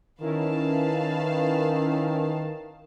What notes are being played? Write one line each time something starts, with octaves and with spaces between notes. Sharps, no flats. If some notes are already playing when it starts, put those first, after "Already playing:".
D#3 C#4 E4 A#4 B4 F5 A5